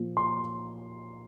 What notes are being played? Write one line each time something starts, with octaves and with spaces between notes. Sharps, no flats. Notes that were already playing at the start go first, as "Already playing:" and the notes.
Already playing: A#2 F3
C6